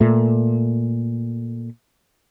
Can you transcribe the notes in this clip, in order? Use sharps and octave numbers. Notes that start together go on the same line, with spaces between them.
A#2 A3